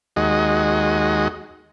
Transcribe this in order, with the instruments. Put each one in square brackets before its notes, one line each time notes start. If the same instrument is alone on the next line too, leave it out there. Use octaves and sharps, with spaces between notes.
[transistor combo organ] D#2 G#3 F#4 D#5